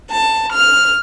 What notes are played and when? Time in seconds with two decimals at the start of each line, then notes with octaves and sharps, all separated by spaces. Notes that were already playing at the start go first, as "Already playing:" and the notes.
0.12 A5
0.53 F6